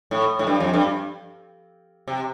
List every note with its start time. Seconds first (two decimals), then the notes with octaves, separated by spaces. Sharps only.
0.11 A2
0.39 A2
0.47 G2
0.60 F2
0.74 G2
2.08 C3